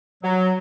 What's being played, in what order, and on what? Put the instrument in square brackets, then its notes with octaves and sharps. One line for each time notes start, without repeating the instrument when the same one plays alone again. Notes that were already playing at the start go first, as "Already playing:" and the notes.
[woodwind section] F#3